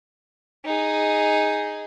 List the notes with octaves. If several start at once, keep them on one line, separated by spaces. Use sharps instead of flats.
D#4 G#4